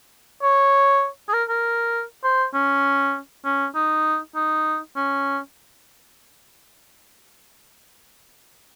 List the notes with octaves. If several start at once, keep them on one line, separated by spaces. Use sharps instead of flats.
C#5
G#4
A#4
A#4
C5
C#4
C#4
D#4
D#4
C#4